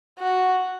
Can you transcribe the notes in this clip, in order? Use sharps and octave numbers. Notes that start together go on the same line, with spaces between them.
F#4